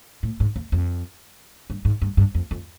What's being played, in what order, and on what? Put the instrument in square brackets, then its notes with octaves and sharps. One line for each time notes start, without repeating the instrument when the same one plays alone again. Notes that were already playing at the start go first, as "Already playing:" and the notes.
[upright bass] A2
G#2
E2
F2
G2
G#2
G2
G2
F2
F2